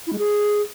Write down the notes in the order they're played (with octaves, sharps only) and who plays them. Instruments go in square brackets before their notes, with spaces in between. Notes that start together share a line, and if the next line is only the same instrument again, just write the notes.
[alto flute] E4
G#3
G#4